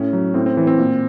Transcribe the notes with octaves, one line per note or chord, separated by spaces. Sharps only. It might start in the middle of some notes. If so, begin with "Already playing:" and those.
Already playing: A2 C#4
F#3
A2 C4
C4
E3
C4
A#2